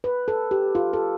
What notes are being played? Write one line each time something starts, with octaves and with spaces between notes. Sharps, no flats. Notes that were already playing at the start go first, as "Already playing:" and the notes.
B4
A4
G4
F4
A4